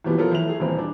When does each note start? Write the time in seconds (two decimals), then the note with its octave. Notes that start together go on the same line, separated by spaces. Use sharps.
0.04 E2 B2 E3 F3 G3 B3
0.18 F3 F#3 B3 F4 A4 A#4
0.32 E2 E4 F7
0.46 A3 G#4
0.60 D#1 E2 C4
0.79 D4